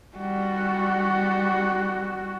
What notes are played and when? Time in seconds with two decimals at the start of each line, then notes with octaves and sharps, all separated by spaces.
0.17 G3 F#4